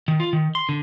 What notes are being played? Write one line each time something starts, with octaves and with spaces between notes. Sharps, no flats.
D#3
F4
D#3
C6
D3